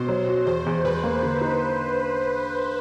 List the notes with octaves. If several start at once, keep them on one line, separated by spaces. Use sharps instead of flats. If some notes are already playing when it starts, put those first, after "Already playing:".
Already playing: B2 C5
F#3
F#4
E2 C5
E2
E2 B4
A#3
D3
D#4